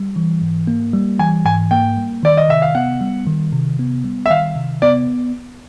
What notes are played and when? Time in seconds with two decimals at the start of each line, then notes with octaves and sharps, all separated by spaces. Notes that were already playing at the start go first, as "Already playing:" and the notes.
Already playing: G3
0.16 E3
0.41 G#2
0.67 A#3
0.93 G3
1.19 E3 G#5
1.45 G#2 G#5
1.71 A#3 G5
1.97 G3
2.23 D#3 D5
2.37 D#5
2.49 C3 E5
2.62 F5
2.75 B3 F#5
3.01 G3
3.27 D#3
3.53 C3
3.79 B3
4.04 G3
4.26 E5
4.30 D#3 F5
4.56 C3
4.82 B3 D5